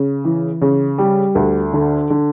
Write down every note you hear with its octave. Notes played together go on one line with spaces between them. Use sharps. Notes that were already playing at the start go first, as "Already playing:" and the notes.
Already playing: C#3
E3
C#3
G3
D2
D3
D3